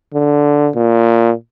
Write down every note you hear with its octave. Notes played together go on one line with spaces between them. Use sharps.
D3
A#2